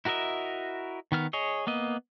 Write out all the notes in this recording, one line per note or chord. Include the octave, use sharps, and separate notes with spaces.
E4 F#4 A#4 D#5 E5
D#3 B3 F6
G#4 C#5 D#5
A#3 B3 D#5